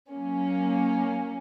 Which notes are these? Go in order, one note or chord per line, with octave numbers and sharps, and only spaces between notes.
F#3 A#3 C#4